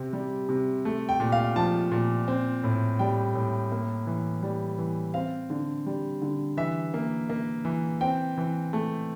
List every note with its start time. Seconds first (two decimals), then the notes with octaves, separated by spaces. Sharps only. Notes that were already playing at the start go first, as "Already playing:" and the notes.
Already playing: C3 C4
0.13 G3
0.49 C3
0.85 A3
1.09 G5
1.20 A#2
1.32 F5
1.56 F3 A5
1.92 A#2
2.28 C4
2.64 A2
2.99 G3 G5
3.35 A2
3.72 A#3
4.07 E3
4.43 G3
4.78 E3
5.14 C4 F5
5.50 D3
5.86 G3
6.22 D3
6.57 E3 E5
6.94 A#3
7.29 A#3
7.65 E3
8.01 C4 G5
8.38 E3
8.73 A3